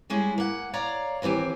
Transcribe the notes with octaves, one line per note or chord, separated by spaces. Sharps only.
G3 G#3 C#4 E4 G#4
A#3 F#5
C#5 D5 F5 A#5
D#2 E3 C4 G4 G#5